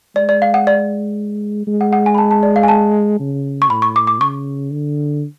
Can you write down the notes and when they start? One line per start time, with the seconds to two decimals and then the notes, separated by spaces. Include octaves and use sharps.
0.16 G#3 D5
0.29 D5
0.42 F5
0.54 F#5
0.67 D5
1.67 G#3
1.81 F#5
1.93 F#5
2.06 G#5
2.15 B5
2.18 A5
2.31 A5
2.43 D5
2.56 F5
2.63 G#5
2.68 A5
3.19 C#3
3.62 C#6
3.70 A2 B5
3.82 C#6
3.96 D6
4.07 D6
4.20 C#3 C#6
4.71 D3